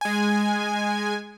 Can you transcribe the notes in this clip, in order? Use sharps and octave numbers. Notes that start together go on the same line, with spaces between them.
G#3 G#5